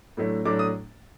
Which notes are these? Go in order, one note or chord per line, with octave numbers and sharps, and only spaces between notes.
A2 F#3 A3 D4
A2 F#3 A3 D4 D6
D#6